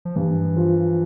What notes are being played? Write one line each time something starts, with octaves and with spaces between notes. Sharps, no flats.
F3
G2 E3
F3